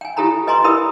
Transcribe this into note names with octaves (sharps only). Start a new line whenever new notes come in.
G5 G#5
E4 F4 G4 A4 A#5 B5
B4 D#5 G#5 A#5 C6 C#6
E4 G4 A#4 B4 B5 D#6